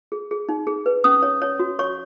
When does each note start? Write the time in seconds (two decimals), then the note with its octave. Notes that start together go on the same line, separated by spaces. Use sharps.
0.12 G#4
0.31 G#4
0.49 D#4
0.67 G#4
0.86 B4
1.04 C#4 D#6
1.22 C#5
1.42 C#5
1.60 F#4
1.79 C#5 C#6